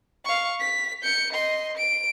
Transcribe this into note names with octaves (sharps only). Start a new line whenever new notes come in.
F5 C#6
B6
G6 C#7
D#5 C6
D7